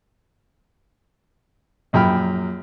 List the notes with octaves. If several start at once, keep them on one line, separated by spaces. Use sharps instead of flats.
A#1 F#2 G5 B5 F6